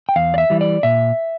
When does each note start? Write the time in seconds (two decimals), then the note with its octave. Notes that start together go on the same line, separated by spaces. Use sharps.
0.09 G5
0.16 E2 F5
0.34 D5
0.38 E5
0.50 E3 G3
0.61 D5
0.83 A#2 E5